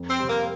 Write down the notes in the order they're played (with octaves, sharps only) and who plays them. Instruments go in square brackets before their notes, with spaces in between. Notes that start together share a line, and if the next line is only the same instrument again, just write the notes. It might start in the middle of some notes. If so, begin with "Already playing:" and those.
Already playing: [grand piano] F2
[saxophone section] C4
[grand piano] C3 G3
[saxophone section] A#3